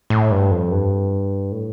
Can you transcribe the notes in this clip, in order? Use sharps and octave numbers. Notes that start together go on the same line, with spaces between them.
A2
G2
F2
G2
A2